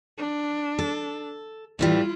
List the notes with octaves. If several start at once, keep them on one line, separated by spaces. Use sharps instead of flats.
D4
A4
A2 E3 G3 E4 F4